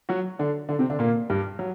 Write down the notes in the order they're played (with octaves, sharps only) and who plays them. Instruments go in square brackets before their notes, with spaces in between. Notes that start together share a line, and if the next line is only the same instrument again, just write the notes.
[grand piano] F#3 F#4
D3 D4
D3 D4
C3 C4
D3 D4
A#2 A#3
G2 G3
F#3